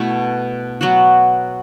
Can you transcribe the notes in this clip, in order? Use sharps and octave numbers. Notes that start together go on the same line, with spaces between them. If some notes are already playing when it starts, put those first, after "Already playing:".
Already playing: B2 A3 E4
F#3 B3 F#4